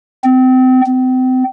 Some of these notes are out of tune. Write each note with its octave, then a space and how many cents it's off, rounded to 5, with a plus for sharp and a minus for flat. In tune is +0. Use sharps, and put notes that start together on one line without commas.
C4 -30
C4 -35